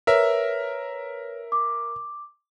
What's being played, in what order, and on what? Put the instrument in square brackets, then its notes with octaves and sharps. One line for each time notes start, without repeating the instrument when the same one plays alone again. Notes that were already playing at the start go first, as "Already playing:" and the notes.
[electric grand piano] A#4 E5 [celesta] B4 C#5
[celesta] D6